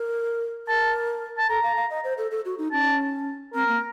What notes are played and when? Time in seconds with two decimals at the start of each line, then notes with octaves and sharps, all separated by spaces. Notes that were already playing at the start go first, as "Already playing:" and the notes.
Already playing: A#4
0.67 A#4 A5
1.38 A5
1.49 A4 A#5
1.63 F5
1.77 F5
1.90 D#5
2.04 C5
2.18 A4
2.31 A4
2.45 F#4
2.58 D#4
2.72 C#4 A5
3.54 C4 A#4
3.68 A#3